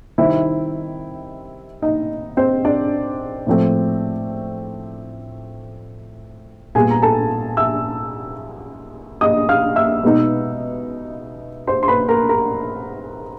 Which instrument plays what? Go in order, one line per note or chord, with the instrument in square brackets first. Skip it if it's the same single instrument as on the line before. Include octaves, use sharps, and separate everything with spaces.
[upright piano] C3 D#3 G3 C4 D#4 E4 E5
D#4 D#5
C4 C5
D4 D5
A2 F3 A3 C4
A#2 G3 B3 G#4 G#5
A#5
A4 A5
E5 E6
D#5 D#6
F5 F6
E5 E6
B2 G#3 B3 D#4
C5 C6
C6
B4 B5
A#4 A#5
A#4 A#5